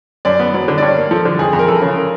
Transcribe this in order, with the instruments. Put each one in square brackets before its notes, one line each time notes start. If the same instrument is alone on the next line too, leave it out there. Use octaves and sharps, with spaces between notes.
[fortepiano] F#2 [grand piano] D5
[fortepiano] B3
F#3
D3
[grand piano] D5
[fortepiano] G2 [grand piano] C#5
[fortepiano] A#3
[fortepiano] F3 [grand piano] A4
[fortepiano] D3
[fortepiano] F2 [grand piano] G#4
[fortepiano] F2
[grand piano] A#4
[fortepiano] E3 [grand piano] A4
[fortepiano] C#3
[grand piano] A#4